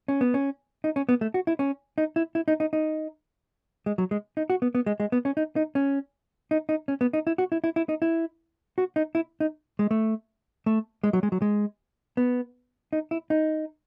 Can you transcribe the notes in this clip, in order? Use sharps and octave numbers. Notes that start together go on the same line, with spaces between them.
C#4
B3
C#4
D#4
C#4
B3
A3
F#4
E4
C#4
D#4
E4
E4
D#4
D#4
D#4
G#3
F#3
G#3
D#4
F#4
B3
B3
G#3
G#3
B3
C#4
D#4
D#4
C#4
D#4
D#4
C#4
B3
D#4
E4
F#4
E4
E4
E4
D#4
E4
F#4
D#4
E4
D#4
G#3
A3
A3
G#3
F#3
G#3
F#3
G#3
B3
D#4
E4
D#4